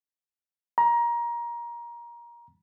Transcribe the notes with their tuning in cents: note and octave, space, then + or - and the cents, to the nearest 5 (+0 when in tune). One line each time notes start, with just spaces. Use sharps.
A#5 +20